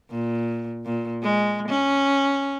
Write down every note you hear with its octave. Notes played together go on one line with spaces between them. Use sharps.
A#2
A#2
G#3
C#4